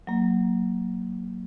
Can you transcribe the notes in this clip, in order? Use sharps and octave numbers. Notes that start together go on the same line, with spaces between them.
F#3 A#3